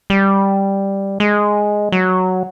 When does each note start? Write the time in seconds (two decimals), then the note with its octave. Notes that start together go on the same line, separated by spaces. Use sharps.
0.10 G3
1.20 G#3
1.92 F#3